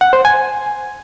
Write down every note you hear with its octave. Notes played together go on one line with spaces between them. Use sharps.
F#5
C5
G#5